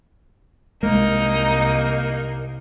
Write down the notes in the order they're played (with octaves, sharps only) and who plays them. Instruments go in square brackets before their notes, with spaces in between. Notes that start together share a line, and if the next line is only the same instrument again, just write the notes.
[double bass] C2 [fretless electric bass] G#3 [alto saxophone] A#3 [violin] D#4